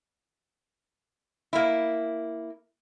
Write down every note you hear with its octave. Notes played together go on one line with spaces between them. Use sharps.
A#3 E4